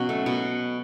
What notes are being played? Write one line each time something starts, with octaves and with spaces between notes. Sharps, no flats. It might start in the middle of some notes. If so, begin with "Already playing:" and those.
Already playing: B2 F#3 C#4 F#4
A3
B2